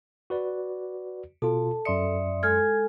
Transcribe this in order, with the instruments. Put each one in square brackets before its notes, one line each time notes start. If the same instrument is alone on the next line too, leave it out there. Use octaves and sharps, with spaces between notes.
[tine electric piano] F#4 B4 D5
[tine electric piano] B2 F4 [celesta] A4 [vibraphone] A5
[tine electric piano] F#2 C6 C#7 [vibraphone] D5 E5 D#6
[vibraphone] G#3 A4 G#5 [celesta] F6 G#6